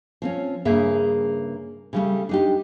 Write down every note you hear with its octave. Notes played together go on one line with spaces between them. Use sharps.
F3 C4 C#4
G2 C#3 A#3 G#4 E5
C#3 G3 A3
D4 D#4 G4